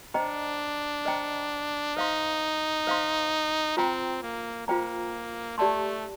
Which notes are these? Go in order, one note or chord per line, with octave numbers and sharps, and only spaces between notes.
D4 C5 D#5 G5 A#5
C5 D#5 G5 A#5
D#4 C5 F5 C6
C5 F5 C6
C4 F4 C5 G5 A#5
A#3
A#3 F4 C5 G5 A#5
A3 G4 D5 A5 C6